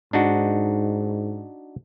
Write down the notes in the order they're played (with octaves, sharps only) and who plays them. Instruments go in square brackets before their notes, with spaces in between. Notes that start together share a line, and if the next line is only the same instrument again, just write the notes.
[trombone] G#2 [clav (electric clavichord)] D4 D#4 F#4